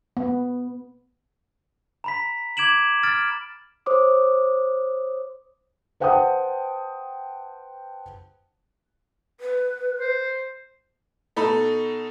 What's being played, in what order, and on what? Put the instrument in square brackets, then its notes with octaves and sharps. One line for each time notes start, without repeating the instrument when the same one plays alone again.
[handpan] B3
[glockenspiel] A#5 B5 B6
D6 G#6 D7 E7 F#7
F6 A6 D7
[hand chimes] C5 C#5 D6 D#6
[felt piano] B4 C5 F#5 G5 A5 D#6
[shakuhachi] B4
[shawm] C5
[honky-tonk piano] B2 D#4 A4 B5